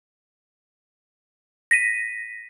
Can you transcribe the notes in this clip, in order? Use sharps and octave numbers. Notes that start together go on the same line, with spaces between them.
A#6 B6 D#7